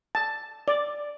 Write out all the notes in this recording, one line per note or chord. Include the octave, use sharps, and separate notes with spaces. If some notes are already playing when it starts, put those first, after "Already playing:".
A5
D5